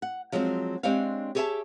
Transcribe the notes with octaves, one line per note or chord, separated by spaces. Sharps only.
F#5
F3 F#3 G#3 A#3 C4
G#3 C4 D4 G4 C#5 F5
G4 G#4 C#5 D#5 E5 A5